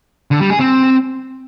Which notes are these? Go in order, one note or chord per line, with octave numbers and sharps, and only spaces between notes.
D3
G3
G#4
C4